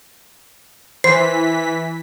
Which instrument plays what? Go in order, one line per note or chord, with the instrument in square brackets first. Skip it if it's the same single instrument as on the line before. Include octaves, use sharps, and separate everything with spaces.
[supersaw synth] E3 B6 [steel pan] C5 [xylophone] C7